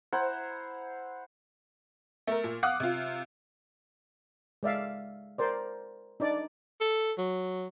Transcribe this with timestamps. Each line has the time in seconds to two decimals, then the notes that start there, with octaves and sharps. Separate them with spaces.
0.13 E4 C5 F#5 A#5
2.27 A3 A#4
2.44 A#2
2.63 F5 F#5 D6 D#6 F#6
2.80 C3 F4
4.63 G#3 D5 E5 F5
5.38 A#4 C5 D5
6.20 D4 D#4 D5
6.81 A4
7.18 F#3